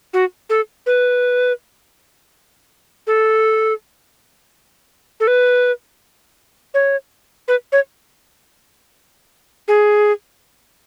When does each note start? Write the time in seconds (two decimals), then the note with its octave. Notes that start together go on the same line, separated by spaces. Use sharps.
0.13 F#4
0.50 A4
0.86 B4
3.07 A4
5.20 A4
5.27 B4
6.74 C#5
7.48 B4
7.72 C#5
9.68 G#4